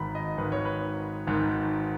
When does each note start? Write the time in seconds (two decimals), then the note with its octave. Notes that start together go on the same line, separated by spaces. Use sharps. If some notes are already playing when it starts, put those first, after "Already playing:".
Already playing: G#1 G#2 D#3 A#5 B5
0.15 D#5
0.37 G#1 G#2 D#3 B4
0.52 C#5
0.65 B4
1.27 G#1 G#2 D#3